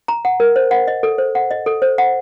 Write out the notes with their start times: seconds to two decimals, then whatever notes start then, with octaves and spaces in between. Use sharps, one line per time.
0.08 A#5
0.25 F#5
0.40 A#4
0.56 C5
0.71 F#5
0.88 D#5
1.03 A4
1.18 C5
1.35 F#5
1.51 D#5
1.66 A4
1.82 C5
1.98 F#5